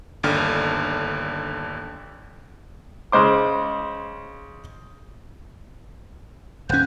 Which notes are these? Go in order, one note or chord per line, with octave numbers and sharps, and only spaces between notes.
G1 D#2 D3 F6
C#3 G#3 C5 D6
D#1 C#4 F#6 G6